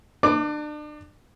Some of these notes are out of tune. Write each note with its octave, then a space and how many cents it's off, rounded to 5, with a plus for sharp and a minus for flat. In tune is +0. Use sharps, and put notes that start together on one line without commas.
D4 +35 D5 +35 D6 +0